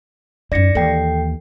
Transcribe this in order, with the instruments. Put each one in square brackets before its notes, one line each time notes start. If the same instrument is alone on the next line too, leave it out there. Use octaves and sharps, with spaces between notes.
[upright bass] F#2 D#4 [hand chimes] D5 A#6 C#7
[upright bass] D#2 E3 [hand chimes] A4 G5 C7